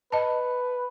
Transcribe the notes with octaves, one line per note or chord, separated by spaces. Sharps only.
B4 D#5 A5